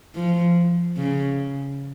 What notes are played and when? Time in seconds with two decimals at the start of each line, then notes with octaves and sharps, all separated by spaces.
0.15 F3
0.97 C#3